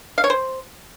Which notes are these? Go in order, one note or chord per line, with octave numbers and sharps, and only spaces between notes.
F5
C#5
C5